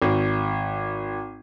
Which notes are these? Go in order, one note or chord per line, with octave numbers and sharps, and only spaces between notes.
G#1